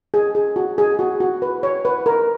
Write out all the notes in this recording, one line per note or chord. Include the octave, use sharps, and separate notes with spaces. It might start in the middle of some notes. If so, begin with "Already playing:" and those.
G#4
G#4
F#4
G#4
F#4
F#4
B4
C#5
B4
A#4